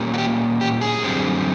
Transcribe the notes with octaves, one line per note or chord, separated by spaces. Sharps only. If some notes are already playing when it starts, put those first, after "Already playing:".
Already playing: A#2 G3 A#3 C#4
F#4
G4
G4
G#4
F#2 D3 G3 C4